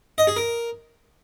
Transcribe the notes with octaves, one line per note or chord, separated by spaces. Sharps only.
D#5
G#4
A#4